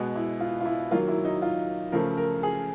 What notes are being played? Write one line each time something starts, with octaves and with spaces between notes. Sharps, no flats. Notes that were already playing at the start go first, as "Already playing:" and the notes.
Already playing: B2 G#3 B3
E4
F4
F4
E4
D#3 F#3 A#3 F4
E4
D#4
F4
C#3 F3 A3 A#4
A#4
G#4